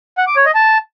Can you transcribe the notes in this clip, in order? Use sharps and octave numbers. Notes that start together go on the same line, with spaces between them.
F#5
D6
C#5
D#5
A5